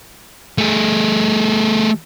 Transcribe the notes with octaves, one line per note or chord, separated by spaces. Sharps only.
A3 G#4